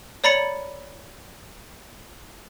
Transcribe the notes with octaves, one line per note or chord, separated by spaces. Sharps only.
C#5 D5 A#5 B5 A6 C#7